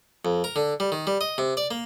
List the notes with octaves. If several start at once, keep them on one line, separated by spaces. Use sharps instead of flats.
F2
A#4
D3
G3
D#3
G3
D#5
C3
D5
A#3